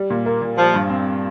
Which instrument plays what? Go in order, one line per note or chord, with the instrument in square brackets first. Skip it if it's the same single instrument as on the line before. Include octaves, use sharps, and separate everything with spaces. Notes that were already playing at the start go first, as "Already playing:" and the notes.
Already playing: [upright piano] G3
A#2
A#3
A#2
[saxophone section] F3 [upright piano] G3
[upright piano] G2
C4